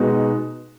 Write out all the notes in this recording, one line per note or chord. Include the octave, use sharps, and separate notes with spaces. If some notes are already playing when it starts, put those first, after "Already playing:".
Already playing: B2 G#3 B3 D#4 F#4